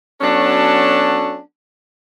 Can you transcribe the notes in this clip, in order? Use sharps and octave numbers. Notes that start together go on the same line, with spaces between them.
F#3 B3 C#4 D4 F#4 A4